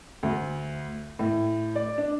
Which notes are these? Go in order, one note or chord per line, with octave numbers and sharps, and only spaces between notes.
D2
A2
D5
D4